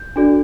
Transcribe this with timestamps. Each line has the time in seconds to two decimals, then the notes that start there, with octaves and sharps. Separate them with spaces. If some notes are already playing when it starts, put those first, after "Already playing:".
Already playing: G6
0.16 D4 F#4 A4 D5